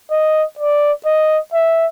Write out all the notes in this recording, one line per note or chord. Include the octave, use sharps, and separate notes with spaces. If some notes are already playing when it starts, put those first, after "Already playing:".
D#5
D5
D#5
E5